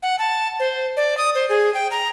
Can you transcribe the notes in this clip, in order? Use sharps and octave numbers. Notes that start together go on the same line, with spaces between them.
F#5
A5
C5
D5
D#6
C5
G#4
G5
A#5